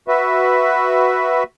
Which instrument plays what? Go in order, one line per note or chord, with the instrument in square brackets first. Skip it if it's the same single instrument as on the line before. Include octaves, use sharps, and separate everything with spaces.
[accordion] F#4 B4 E5